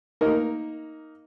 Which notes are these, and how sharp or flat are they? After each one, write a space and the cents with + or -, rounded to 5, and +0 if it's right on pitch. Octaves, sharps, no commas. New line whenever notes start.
A#3 +0 D#4 +10 A#4 +0